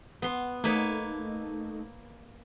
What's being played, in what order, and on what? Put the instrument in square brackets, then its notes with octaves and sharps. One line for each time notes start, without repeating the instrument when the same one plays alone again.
[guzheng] B3 C6
[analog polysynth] A3 D#4 [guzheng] A#3 B4 C#5